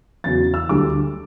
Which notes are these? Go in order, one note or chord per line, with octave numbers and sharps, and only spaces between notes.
E2 C#3 F#3 A6
E6
D2 D3 G3 D6